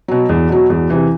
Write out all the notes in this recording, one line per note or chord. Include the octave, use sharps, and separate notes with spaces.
B2 F#3
E2
B2 F#3
E2
C3 E3